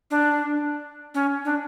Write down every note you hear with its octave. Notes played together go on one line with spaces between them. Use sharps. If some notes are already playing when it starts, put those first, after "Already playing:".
D4
C#4
D4